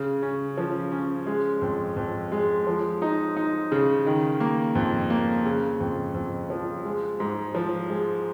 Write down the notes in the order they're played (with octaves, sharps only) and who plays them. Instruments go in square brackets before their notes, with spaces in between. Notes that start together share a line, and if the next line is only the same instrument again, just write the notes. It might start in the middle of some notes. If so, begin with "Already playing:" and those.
Already playing: [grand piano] C#3
C#4
F3
C#4
G#3
F2
F2
G#3
F3
D#4
D#4
C#3
D#3
A#3
F2
A#3
C#3
F2
F2
F3
G#3
G#2
F3
G#3